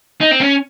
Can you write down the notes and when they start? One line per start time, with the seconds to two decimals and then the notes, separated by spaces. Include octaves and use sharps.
0.21 D#4
0.31 C4
0.41 C#4